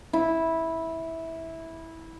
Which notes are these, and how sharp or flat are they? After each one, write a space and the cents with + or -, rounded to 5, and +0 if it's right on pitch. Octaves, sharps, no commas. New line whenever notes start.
E4 -15